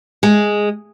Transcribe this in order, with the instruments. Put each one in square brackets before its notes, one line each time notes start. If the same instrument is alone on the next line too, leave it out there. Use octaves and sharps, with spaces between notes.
[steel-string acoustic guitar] G#3